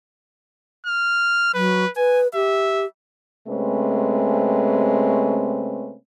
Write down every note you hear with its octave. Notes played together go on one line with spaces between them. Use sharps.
F6
F#3 B4
B4 G#5
G4 E5
C3 G#3 A3 C4 C#4 B4